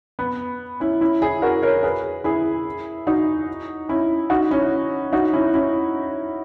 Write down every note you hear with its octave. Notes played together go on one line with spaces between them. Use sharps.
B3
C#4 E4
C#4 E4
E4 G#4
F#4 A#4
A#4 C#5
G#4 B4
E4 G#4
D#4 F#4
C#4 E4
D#4 F#4
C#4 E4
D#4 F#4
C#4 E4
C#4 E4